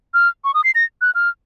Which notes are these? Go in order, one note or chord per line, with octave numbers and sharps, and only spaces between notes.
F6
C#6
D#6
C7
A#6
F#6
F6